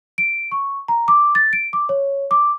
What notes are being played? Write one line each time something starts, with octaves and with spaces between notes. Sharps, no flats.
D7
C#6
A#5
D6
A6
D7
D6
C#5
D6